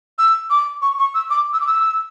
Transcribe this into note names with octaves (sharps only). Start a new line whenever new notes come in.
E6
D6
C#6
C#6
E6
D6
E6
D6
E6